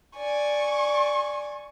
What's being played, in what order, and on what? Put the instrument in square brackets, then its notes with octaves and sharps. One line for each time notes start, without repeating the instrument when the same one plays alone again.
[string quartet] D5 G#5 [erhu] C#6